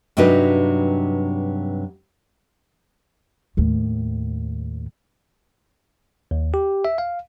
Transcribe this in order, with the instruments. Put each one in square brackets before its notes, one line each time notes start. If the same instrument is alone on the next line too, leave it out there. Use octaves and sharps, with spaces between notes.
[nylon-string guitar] G2 C3 F#3 D4 D#4 B4
[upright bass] D#2 A2
[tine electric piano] D#2
G4
E5
F5